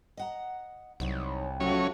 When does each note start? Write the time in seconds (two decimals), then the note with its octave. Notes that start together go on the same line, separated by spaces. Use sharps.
0.17 D#5 F#5 A#5
1.00 C2 F#3 D#4 C#5
1.60 F2 C#3 F3 F#3 A3 C#4 F#4 C#5